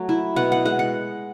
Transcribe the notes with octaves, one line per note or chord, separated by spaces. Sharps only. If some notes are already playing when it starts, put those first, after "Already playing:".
Already playing: F#3 A3
E4
B2 F#5
F#5
G#3 F#5
F#5